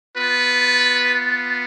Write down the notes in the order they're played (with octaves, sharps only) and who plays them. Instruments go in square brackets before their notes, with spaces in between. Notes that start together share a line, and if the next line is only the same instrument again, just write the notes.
[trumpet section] B3 F4 B4